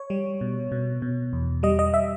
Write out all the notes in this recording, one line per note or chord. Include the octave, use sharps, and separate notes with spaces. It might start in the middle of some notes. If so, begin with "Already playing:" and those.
Already playing: C#5
G3
B2
B2
B2
E2
G3 D#5
D#5
E5